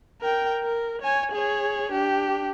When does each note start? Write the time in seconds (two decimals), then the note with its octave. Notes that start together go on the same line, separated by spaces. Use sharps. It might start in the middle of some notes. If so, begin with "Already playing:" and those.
0.21 A#4 G5
0.64 A#4
1.02 C#5 G#5
1.32 G#4 C#5
1.92 D4 G4